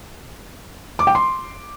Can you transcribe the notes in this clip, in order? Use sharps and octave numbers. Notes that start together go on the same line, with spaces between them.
D6
G5
C6